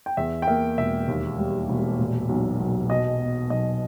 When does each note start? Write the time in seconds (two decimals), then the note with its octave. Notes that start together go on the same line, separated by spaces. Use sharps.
0.06 G5
0.17 E2 E5
0.42 G5
0.47 A#3 E5
0.78 E1 E5
1.08 D#2
1.38 G3
1.69 E1
1.99 A#2
2.29 B1
2.60 B1
2.90 B2 D#5
3.20 B3
3.50 B1 D#5